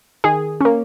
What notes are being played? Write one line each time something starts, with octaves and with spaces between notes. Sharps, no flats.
D#3 G#4
A#3 C#4